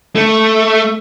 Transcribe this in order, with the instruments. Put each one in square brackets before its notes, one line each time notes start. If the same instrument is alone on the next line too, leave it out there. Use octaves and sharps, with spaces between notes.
[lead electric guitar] A3